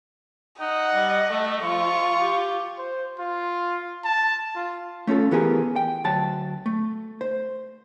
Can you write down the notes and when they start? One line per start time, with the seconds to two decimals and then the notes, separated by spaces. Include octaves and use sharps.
0.60 D#4 D#5 F#5
0.95 G3
1.30 A3 A4
1.62 F3 F4 C#6
2.20 G4
2.78 C5
3.19 F4
4.04 A5
4.55 F4
5.07 A3 C#4 F4 A4
5.31 E3 B3 G4 G#4 A#4
5.76 G5
6.04 D2 F#3 A5
6.66 A3
7.21 C5